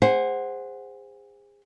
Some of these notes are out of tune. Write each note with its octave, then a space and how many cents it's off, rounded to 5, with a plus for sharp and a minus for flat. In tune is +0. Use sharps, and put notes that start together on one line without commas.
G#4 -30 C5 +0 F#5 +0